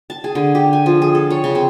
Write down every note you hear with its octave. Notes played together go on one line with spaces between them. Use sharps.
A5
G#4
D3
G4
G#5
F3
G#4
A4
C#5
C#3
C4